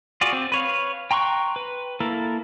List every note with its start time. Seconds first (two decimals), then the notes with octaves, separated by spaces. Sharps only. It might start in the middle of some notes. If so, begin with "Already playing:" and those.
0.21 F4 F#4 G#4 D5
0.33 C4
0.52 B4 C#5 F5
1.11 G5 A#5 C6 C#6 F#6
1.56 B4
2.00 A#3 E4 A4 A#4